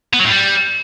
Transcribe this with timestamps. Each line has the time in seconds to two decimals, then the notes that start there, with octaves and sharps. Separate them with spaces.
0.13 B3
0.19 F#3
0.25 A2
0.30 G3